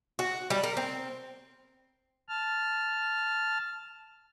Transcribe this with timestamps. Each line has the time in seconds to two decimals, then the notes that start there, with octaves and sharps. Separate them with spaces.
0.19 F#4
0.50 G3
0.63 A#4
0.77 C4
2.29 A5 F6